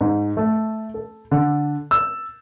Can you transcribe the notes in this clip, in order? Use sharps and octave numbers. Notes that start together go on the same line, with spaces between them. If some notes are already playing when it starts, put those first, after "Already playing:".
G#2
A3
A4
D3
E6